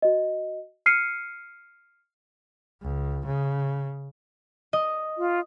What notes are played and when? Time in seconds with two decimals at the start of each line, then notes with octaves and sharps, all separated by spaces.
0.02 F#4 D#5
0.86 F6 C7 C#7 D#7
2.82 C#2
3.26 C#3
4.73 D#5
5.18 F4